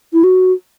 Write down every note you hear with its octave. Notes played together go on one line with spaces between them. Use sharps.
E4
F#4